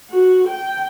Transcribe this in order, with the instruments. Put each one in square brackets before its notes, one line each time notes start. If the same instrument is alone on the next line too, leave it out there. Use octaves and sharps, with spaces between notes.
[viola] F#4
G5